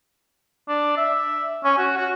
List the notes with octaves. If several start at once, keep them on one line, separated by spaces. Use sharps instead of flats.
D4
E5
C#4
F#4
F#4